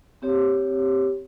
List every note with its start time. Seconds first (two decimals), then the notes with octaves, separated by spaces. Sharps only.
0.22 C4 G4 C#5